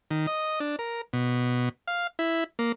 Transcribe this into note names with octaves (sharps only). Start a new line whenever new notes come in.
D#3
D#5
D4
A#4
B2
F5
E4
A#3